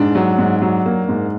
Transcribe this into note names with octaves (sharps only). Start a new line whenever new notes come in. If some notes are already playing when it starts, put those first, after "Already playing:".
Already playing: G#2 D4
F#3
G#2
F#3
A#3
G#2